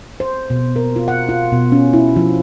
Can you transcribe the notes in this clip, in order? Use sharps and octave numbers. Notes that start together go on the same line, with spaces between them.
C5
B2
A#4
F4
F#5
F4
B2
C#4
E4
F3